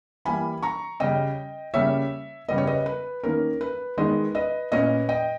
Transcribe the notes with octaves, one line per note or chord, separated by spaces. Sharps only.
E3 G3 A#3 G#5 B5
A#5 C#6
C#3 G3 C#4 D#5 G5
C#3 G3 A#3 C#4 C#5 E5
C#3 G3 B3 D#5
C#5
B4 D#5
B4
D#3 A#3 C#4 A#4
B4
D#3 G#3 B3 B4 D#5
B4 D#5
A#2 A#3 C#4 B4 D#5
D#5 G5